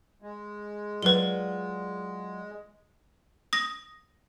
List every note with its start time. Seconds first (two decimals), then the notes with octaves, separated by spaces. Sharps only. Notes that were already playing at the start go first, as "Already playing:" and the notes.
0.22 G#3
1.03 F#3 F4 B4 D5 G7
3.53 D#6 A#6